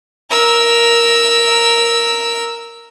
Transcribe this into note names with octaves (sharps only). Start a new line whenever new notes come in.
A#4 E6